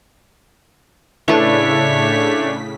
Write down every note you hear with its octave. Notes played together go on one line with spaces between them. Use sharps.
A2 C#3 A3 D4 E4 B4 C#5 B6